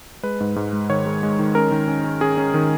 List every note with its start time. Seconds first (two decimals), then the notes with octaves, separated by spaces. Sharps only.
0.23 G#3 B4
0.40 G#2
0.56 G#2
0.73 G#3
0.90 D#3 C#5
1.06 G#3
1.23 G#3
1.39 D#3
1.55 C#4 A#4
1.72 D#3
1.88 C#4
2.04 C#4
2.21 C#4 G#4
2.37 C#4
2.54 D#3